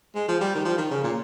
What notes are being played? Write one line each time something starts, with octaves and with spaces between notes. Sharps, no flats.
G#3
F3
G3
D#3
F3
D#3
C#3
A#2